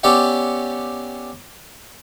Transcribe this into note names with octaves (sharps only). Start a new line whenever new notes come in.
B3 C#4 G4 D5 E5 F#5